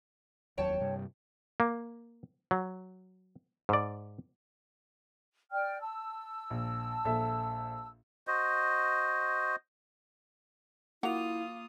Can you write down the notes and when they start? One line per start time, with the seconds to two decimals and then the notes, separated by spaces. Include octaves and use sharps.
0.58 F1 D#2 F#3 C#5 G5 A5
0.80 G2 C3 G3
1.60 A#3
2.51 F#3
3.69 G#2 D5
5.52 D5 G5 F6
5.80 A5 E6
6.50 A#1
7.05 A#1 A4 E5
8.27 F#4 C5 D#5
11.03 F#3 A#3 E4 F4 A#4 F#5 D#6 F7